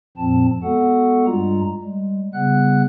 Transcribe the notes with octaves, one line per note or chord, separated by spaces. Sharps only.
F2 A#2 F3 C4 A5
G#3 B3 F#4 A4 F#5
G2 G3 G#3 F4 A#5
G3 G#3
C#3 G3 B3 F#5 F#6